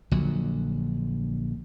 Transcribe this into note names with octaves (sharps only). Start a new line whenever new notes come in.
A#1 D3 F#3